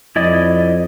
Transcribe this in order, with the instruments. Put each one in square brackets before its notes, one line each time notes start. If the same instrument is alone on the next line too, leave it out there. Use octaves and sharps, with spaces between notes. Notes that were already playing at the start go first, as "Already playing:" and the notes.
[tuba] F2 [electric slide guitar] E4 D5 D#5